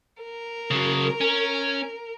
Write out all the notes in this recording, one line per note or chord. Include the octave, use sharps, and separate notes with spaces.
A#4
C#3 F#3
C#4